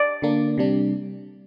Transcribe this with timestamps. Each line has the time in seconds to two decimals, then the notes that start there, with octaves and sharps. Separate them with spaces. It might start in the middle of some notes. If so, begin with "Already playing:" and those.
Already playing: D5
0.22 D3 A#3 D4
0.58 C3 G3 D4